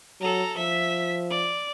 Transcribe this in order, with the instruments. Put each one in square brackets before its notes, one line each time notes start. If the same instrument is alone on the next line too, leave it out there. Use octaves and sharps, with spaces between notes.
[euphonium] F#3 [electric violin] A4 A#5
[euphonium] F3 [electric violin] E5 B6
[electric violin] D5